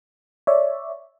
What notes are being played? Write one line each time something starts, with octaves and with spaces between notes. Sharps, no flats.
C#5 D5 E5